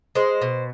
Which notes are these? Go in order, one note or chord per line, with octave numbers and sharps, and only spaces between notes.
G#3 C5
B2